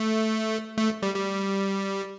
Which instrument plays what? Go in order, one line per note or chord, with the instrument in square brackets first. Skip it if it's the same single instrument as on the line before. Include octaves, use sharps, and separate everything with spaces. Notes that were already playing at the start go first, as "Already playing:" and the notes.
Already playing: [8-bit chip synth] A3
A3
G3
G3